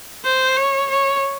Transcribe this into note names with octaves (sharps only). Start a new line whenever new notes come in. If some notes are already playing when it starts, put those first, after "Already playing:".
C5
C#5
C#5